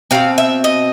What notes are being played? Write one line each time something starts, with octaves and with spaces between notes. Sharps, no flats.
B2 G3 C4 F5
E5
D#5